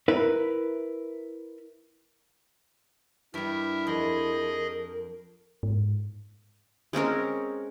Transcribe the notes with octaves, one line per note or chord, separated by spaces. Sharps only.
E4 A#4 B4
G2 G3 E4 A#4 E5
F2 G#4 A#4 D#5
G#2
G#3 C4 C#4 A#4